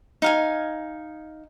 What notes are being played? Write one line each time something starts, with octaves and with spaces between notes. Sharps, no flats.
D#4 F5 G#5